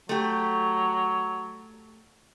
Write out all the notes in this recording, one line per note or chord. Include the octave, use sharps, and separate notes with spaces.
F#3 A3 G4